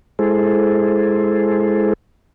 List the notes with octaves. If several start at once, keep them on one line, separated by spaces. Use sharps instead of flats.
G#3 E4 G#4 A4 C5